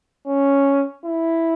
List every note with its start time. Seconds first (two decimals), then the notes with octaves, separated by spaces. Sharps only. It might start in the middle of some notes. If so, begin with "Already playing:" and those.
0.27 C#4
1.06 E4